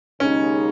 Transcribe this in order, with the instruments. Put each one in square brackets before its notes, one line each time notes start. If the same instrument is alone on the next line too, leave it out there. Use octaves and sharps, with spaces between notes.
[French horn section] D#2 C#3 G#3 D#4 [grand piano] C#4